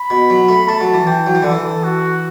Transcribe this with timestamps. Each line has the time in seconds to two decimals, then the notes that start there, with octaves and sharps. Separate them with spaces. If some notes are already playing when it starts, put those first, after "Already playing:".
Already playing: B5
0.10 B2
0.30 F#3
0.49 A3
0.68 A3 A5
0.81 F#3
0.94 E3
1.07 E3 G5
1.27 F#3
1.35 E3
1.43 D3 A4
1.52 E3
1.84 F#4